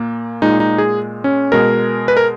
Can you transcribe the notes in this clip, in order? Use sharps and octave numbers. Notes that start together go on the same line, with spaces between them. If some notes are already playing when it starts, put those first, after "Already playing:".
Already playing: A#2 A#3
A#2 G#3 D#4
D#4
G#4
C#4
B2 G#3 A#4
B4
A#4